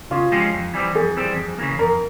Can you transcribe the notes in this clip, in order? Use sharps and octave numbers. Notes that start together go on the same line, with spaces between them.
C#3 F4
F3 G#3 C#4 G4
F2
E3 G3 C4
F2 G#4
E3 G3 C4
F2
C#3 E3 A#3
F2 A#4